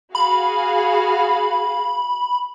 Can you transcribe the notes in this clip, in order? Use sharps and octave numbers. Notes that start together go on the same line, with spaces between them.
F#4 G#4 F5 B5